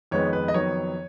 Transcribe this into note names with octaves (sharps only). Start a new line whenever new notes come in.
F2 D#3 G#3 B3 C#5
B4
D#5
F2 D#3 F#3 B3 C#5